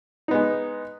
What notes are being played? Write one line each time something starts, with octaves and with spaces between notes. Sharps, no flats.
G#3 B3 D#4